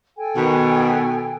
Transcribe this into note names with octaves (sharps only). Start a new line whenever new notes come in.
A4 G5 G#5
B2 D#3